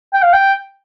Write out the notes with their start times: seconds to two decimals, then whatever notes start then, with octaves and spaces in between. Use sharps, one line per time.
0.14 G5
0.23 F5
0.34 G5